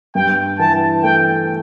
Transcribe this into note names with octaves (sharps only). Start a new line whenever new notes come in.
G2 G5
E3 A5
A3 G5